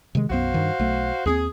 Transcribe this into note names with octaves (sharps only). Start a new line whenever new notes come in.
C3 D#3 G#3
B1 F#2 B3 F#4 C5 F5
G2 D#3
B1 A3
D#2 B3 C4 G#4